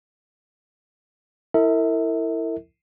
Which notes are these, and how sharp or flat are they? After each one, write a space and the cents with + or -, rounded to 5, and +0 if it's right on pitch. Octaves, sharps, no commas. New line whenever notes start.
E4 +0 A#4 -45 E5 -35